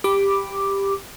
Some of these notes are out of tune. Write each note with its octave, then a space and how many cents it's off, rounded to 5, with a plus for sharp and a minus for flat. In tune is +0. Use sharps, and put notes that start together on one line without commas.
G4 +10 B5 +0 D6 +0